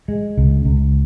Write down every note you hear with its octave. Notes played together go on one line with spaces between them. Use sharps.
G#3
C#2
C#2